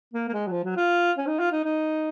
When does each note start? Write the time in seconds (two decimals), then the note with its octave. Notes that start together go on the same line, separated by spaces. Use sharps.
0.14 A#3
0.29 A#3
0.33 G#3
0.47 F#3
0.51 F3
0.64 F#3
0.77 F4
1.17 C#4
1.27 D#4
1.39 F4
1.52 D#4
1.64 D#4